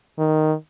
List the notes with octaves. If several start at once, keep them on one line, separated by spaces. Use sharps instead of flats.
D#3